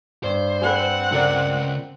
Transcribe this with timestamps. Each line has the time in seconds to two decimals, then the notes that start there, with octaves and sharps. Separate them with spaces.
0.24 G2 C5
0.61 C4 G#4 A4 B4 F#5
1.12 C#3 F4 A4 A#4 D5